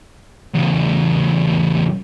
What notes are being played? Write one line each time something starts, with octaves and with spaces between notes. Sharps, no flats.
E2 C#3